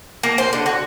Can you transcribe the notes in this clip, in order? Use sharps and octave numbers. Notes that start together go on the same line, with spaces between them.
A#3
C5
D3
F#4